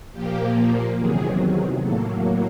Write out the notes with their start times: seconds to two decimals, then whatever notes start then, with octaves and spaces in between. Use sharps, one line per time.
0.12 A#2 F3 A#3 G4
0.97 E2 C3 D#3 F#3 G#4
1.82 A2 F#3 A#3 A4